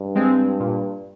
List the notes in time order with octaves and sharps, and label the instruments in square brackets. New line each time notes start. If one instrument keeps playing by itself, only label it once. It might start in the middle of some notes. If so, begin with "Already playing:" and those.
Already playing: [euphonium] G2
[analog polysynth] G#3 C4
A#2